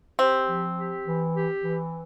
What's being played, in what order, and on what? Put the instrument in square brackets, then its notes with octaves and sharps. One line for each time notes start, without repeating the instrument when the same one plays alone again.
[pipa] C4 [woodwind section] G4
[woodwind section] F3
G4
E3
G4
E3